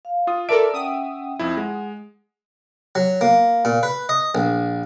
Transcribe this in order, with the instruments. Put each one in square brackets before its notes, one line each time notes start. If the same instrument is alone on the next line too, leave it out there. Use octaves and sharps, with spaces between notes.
[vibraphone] F5
[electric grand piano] F4 D#6
[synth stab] A4 A#4 D5 [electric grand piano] E5 D7 [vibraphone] A5 C6
[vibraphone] C#4 F#5 G5 [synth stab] D#6
[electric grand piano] F2 E4
[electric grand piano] G#3 [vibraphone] F#5
[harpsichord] F#3
A#3
A#2
B4
D#5
A#1